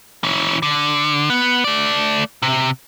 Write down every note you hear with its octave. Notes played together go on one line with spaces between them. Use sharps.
E3 C#4
D3
B3
A3 D5
C3